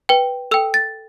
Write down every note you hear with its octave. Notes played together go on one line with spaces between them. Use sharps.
B4 G5
A4 G5 E6
A6